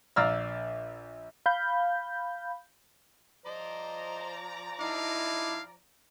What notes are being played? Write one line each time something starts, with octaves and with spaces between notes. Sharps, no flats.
A#1 D5 F5 A#5 E6 F6
F5 B5 G6
F3 C5 D5 D#5 A#5
D#4 E4 F5 A5 D6